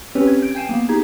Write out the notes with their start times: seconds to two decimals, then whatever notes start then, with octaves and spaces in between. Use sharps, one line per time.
0.15 C4 C#4 G4 B4 C#5
0.27 G#6
0.42 G6 D7
0.55 G5 G#5 G6 C7 D#7 E7
0.69 A#3 B3
0.89 D#4 G4 G#4 A#5 G#6